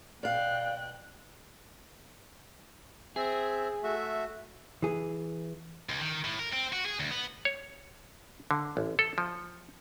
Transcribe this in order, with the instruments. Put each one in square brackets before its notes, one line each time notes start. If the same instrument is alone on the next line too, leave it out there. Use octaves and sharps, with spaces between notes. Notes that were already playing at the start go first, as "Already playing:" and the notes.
[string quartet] B2 G5 F#6 [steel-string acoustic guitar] D5 F5
[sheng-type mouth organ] C4 E5 [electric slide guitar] G#4
[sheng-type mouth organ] A3 F#4 E5
[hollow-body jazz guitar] E3 G#4
[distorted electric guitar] C#2
D#3
A2
A#4
C4
F#4
G#4
D2
B3
[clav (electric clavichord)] C#5
D3
A1
A4
F3